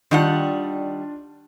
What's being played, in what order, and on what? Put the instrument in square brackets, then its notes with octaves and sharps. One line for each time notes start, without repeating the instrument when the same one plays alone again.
[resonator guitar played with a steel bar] D#3 G3 F#5 [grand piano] D4 F4 A5